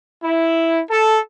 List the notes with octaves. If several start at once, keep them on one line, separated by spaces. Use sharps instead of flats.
E4
A4